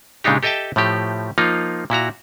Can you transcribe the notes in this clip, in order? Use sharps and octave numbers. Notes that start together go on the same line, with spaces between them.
A#2 C#3 G#3 D4 D#4 G4
G4 A4 D#5 E5 G5 A5
A2 F3 A3 G4
F3 A#3 D#4 F4
A#2 E4 F#4 A#5